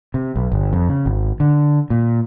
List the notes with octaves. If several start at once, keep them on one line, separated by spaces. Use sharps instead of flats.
C3
B1
G1
F2
C#3
G#1
D3
A#2